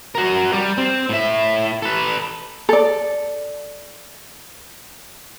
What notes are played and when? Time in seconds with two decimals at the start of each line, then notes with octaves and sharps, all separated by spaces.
0.15 F#4 A#4
0.53 G3
0.78 C4
1.09 A2 E5
1.82 A4 B4
2.69 A4 D5